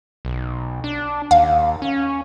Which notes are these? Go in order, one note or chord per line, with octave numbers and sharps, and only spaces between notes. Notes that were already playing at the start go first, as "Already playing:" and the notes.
B1
D4
D#2 F5
C#4